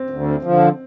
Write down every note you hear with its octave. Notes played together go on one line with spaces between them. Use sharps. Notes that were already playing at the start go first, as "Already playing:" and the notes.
Already playing: C4
D2
D3 F3